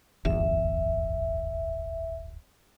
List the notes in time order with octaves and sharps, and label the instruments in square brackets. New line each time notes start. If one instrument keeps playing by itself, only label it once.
[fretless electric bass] D1 G1 E2 [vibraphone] E5